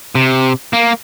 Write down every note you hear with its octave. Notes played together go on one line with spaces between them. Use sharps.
C3
A#3